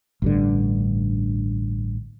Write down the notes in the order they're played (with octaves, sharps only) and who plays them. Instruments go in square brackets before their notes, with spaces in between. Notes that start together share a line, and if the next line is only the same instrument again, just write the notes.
[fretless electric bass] A1 G2 D3